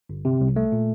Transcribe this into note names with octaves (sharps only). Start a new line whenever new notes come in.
G1
C3
C2
A3
A#2